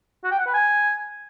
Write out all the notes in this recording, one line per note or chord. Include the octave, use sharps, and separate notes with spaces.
F#4
G5
F#5
B4
G#5